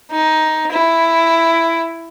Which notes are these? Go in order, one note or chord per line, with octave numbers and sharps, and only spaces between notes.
D#4
E4